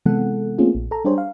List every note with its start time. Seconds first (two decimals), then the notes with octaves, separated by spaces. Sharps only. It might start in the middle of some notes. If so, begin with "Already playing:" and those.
0.06 C3 E3 G#3 B3 A4 F#5
0.58 A3 A#3 C4 C#4 F4 G#4
0.75 A#1
0.91 A4 A#5
1.05 G3 D4 G4 G#4 C5 C#5
1.18 F5